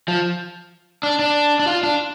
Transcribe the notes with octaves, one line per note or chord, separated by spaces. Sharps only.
F3
D4
D4
D4
F4
D4